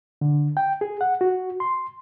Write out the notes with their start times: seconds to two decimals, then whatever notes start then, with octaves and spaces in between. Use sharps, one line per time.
0.21 D3
0.57 G5
0.81 G#4
1.01 F#5
1.21 F#4
1.60 C6